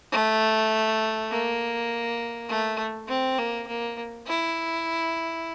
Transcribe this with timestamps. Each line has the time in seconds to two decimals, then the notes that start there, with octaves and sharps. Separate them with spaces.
0.12 A3
1.31 A#3
2.49 A3
3.08 C4
3.38 A#3
3.67 A#3
4.27 E4